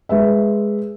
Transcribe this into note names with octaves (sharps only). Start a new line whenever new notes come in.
G#3 B4 E5